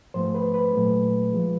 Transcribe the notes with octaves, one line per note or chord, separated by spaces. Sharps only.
G#2 F3 A3 C5
B4
B4
A#2 F#3 A3
F3 G#3